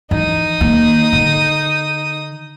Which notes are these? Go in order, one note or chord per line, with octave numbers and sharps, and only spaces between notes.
E3 D#4 D#6
D#3 A#3
D3